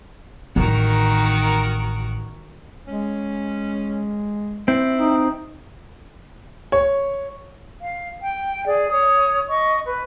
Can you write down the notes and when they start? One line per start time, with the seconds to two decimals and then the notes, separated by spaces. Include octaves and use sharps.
0.56 A1 D#3 F#4 A#4
2.88 G#3 C#4
4.68 C4 E4
4.97 D#4
6.72 C#5
7.81 F5
8.21 G5
8.65 G#4 D5
8.90 C#5 D#6
9.49 D#5 C#6
9.85 B4